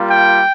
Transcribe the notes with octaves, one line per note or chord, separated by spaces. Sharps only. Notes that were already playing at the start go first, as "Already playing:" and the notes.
Already playing: G3 A#3 F4
G5